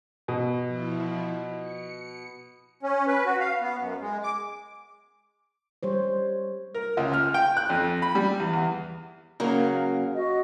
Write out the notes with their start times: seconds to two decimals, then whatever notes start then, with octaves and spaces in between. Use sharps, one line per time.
0.28 B2
0.67 F3 E4
1.58 C#7
2.83 C#4
3.07 B4
3.26 F#4
3.40 F5
3.62 B3
3.80 F#2
4.01 G#3
4.23 D6
5.83 G3 C5 C#5
6.75 A#4
6.97 C#2
7.14 F6
7.34 G5
7.57 F#6
7.70 F2
8.02 B5
8.15 G3
8.40 E2
8.53 E2
9.40 C#3 F#3 A#3
10.15 F#4 D#5